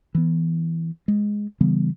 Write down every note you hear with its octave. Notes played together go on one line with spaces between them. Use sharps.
E3 B3
G#3
C#3 E3 G3 B3